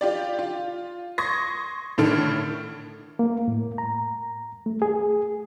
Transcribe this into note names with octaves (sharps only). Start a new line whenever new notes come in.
F4 G4 D5
F4
C6 C#6 D#6 G#6 A#6
A2 D3 D#3 A4 F6 D7
A#3
A2
A#5
A3
G#4